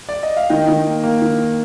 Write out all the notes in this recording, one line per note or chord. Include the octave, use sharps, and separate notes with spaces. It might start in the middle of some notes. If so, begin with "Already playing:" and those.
D5
D#5
F5
D#3 D#5 G5
D#3
A#3
A#3
D#3